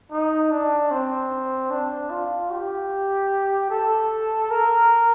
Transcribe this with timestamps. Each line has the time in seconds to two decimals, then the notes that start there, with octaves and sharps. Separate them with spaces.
0.11 D#4
0.51 D4
0.91 C4
1.70 D4
2.10 F4
2.50 G4
3.70 A4
4.50 A#4